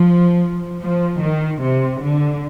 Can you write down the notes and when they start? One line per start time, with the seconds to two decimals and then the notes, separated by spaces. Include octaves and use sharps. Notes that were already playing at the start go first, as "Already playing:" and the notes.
Already playing: F3
0.80 F3
1.21 D#3
1.61 C3
2.01 D3